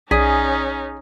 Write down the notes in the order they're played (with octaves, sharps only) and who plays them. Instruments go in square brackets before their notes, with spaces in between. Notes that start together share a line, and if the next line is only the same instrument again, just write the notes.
[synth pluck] B1 [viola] C#4 D#4 [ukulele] G#4 [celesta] D5 G#5 B6